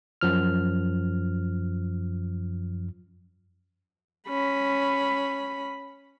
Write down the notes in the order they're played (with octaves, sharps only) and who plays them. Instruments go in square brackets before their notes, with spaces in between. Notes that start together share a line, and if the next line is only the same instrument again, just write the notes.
[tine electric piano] F#2 F3 F6
[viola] C#4 B5